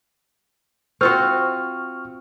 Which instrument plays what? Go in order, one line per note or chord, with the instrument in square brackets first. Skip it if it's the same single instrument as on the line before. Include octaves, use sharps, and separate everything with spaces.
[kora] C4 F4 F#4 [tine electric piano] C#6 F6